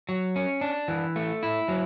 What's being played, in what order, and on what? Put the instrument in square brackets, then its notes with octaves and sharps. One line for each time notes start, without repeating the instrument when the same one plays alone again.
[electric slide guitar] F#3
C#4
D4
E3
A3
E4
F#3